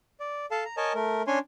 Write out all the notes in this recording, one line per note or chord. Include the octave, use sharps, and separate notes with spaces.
D5
A4 F5 A5
A#5
A#4 C#5 D#5 G#5 A5
A3 A#4
C#4 D4 C#5 G#5 C6